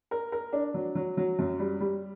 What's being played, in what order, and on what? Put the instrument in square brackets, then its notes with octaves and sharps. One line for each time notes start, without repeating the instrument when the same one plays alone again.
[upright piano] A#4
A#4
D4
F#3
F#3
F#3
F#2
G3
G3